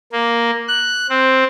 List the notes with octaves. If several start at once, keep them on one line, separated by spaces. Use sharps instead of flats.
A#3
F#6
C4